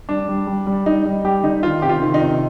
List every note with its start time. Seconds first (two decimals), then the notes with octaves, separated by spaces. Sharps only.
0.09 G3 D4
0.28 G3
0.47 G3
0.67 G3
0.86 G3 D#4
1.05 G3
1.25 G3 G4
1.43 D3 D#4
1.63 D#3 F4
1.82 C3 G4
1.89 F4
2.02 D#3
2.14 D#4
2.21 C3